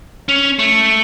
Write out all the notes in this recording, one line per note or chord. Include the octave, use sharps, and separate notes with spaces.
C#4
A3